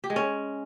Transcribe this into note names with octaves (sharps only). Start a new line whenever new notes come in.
G4
G#3
C#4